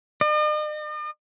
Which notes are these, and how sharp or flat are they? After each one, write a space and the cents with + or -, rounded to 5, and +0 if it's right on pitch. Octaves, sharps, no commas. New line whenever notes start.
D#5 -45